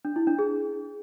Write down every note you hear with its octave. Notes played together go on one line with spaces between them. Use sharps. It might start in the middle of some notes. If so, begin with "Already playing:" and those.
D4
E4
D4
G#4